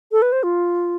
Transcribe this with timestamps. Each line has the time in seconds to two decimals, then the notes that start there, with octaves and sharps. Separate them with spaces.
0.12 A4
0.22 B4
0.32 C5
0.43 F4